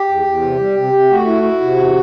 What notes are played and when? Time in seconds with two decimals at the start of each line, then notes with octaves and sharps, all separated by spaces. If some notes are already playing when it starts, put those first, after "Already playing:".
Already playing: G4
0.09 E2
0.26 E2
0.42 C3
0.59 G3
0.77 C3
0.93 C3
1.10 A3 F#4
1.27 E4
1.43 E4
1.61 C3
1.77 E2